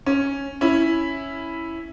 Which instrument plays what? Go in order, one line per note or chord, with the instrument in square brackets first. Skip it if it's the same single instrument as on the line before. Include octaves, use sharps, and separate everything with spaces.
[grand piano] C#4
C#4 E4